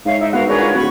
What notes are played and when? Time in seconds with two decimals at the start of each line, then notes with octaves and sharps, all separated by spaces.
0.06 G#2 C#5 E5 F5
0.19 D#4 E4
0.33 B3 F#4 A#4 F5 F#5
0.47 D4 G#4 A#4 B4 C#5
0.59 F4 C#5 F#5
0.75 D1 F#4 B5 C#6